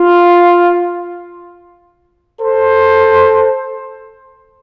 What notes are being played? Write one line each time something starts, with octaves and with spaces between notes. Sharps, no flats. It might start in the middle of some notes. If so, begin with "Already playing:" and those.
Already playing: F4
A4 C5